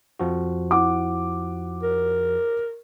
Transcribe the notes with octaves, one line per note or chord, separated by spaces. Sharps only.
F2 F3 F#4
E4 F#5 D6
A#4